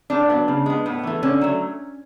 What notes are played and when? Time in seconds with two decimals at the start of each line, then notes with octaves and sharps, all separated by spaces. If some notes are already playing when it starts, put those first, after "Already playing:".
0.10 A2 D4
0.30 F#3 B3
0.48 C#3
0.66 G#3 B3
0.86 A2 B3
1.03 E3 A3
1.23 D3 C#4
1.41 F#3 A3